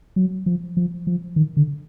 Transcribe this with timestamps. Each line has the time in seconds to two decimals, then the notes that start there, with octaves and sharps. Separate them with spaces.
0.16 F#3
0.46 F3
0.77 F3
1.07 F3
1.36 D#3
1.57 D3